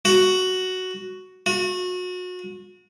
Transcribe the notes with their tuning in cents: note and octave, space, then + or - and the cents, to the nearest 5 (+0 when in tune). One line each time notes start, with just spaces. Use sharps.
F#4 +5
F#4 -30